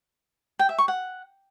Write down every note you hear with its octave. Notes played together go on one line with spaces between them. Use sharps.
G5
E5
C#6
F#5